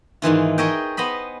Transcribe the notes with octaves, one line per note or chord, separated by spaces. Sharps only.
G#2 D#3 E3 F4
G#4 A#4 C#5 D#5 E5 G5
B3 C5 D#5 B5